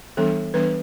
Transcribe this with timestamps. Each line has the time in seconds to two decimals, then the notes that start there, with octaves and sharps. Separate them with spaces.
0.17 E3 G3 B3 D4 A4
0.54 E3 G3 B3 D4 B4